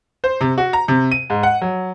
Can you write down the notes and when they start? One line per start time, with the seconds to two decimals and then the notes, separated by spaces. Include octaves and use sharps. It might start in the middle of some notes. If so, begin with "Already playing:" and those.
0.24 C5
0.41 C3
0.58 F#4
0.73 A#5
0.88 C3
1.12 D#7
1.30 G#2
1.43 F#5
1.61 F#3